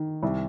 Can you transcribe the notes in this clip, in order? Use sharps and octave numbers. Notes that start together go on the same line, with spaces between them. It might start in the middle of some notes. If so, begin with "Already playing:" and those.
Already playing: D#3
C2